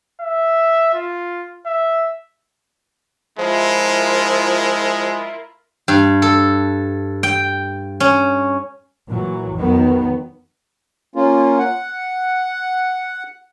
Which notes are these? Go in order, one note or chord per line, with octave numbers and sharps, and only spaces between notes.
E5
F4
E5
F3 G#3 E4 F4 A#4
G2
A4
G5
C#4
A#2 E3 F#3
F2 D#3 F#3 B3
A#3 C#4 F4
F#5